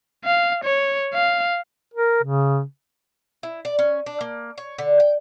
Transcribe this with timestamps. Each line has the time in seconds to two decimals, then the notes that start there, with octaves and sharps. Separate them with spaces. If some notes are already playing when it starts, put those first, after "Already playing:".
0.25 F5
0.64 C#5
1.14 F5
1.94 A#4
2.23 C#3
3.43 E4
3.65 D5
3.79 C#4
4.06 D4
4.21 A#3
4.58 C#5
4.78 D3
5.00 G5